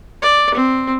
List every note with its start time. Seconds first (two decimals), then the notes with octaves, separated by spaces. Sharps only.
0.22 D5
0.55 C4